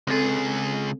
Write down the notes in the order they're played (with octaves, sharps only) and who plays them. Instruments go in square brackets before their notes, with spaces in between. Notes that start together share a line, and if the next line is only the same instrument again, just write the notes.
[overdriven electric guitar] C#2 G#4 [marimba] C4 A4